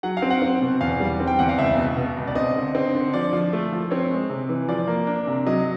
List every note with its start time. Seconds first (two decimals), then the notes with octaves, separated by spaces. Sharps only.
0.03 F#3 F#5
0.17 F5
0.22 C4
0.30 F#5
0.42 C4
0.61 B2
0.81 E2 F5
1.00 G3
1.20 C4
1.27 G5
1.39 E2 F#5
1.49 F5
1.58 C#2 E5
1.77 B2
1.97 B2
2.17 C#2
2.27 D5
2.35 C4 D#5
2.55 D3
2.75 C4
2.95 D3
3.13 F3 D5
3.33 F3
3.53 A3
3.72 F3
3.91 C4 C#5
4.10 G#3
4.30 C3
4.49 E3
4.69 F3 D5
4.87 A#3
5.07 D4
5.27 C3
5.47 F#3 D#5